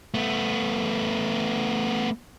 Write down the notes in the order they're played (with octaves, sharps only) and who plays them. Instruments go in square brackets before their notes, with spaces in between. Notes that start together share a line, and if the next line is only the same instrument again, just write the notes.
[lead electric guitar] A3 B3